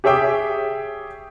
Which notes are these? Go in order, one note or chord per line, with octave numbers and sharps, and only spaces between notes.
G4 G#4 C#5 E5 G5 D6